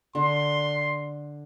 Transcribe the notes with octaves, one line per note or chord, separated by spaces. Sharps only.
D3 C6